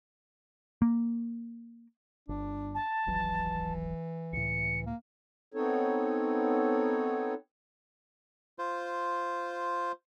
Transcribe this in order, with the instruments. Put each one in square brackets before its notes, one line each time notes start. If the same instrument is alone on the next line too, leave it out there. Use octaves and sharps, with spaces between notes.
[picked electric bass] A#3
[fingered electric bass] G1 [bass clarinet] D4
[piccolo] A5
[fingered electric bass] D#1 G#1 F#3 [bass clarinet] E3
[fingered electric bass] C#2 A2 [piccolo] C#7
[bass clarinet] A#3
[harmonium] B3 C4 D#4 A4 C#5
[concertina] F4 C5